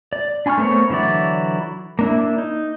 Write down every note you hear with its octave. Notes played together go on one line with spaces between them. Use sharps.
D5
D4 G#5 C6 C#6 F6
A3 B3 C4 A#4 C#5
D3 E3 F#3 E4 D5
A#3 D4 E4
D#4